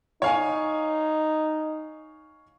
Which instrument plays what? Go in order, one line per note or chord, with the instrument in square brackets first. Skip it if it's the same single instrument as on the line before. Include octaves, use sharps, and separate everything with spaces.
[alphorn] D#4 [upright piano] C#5 F5 G#5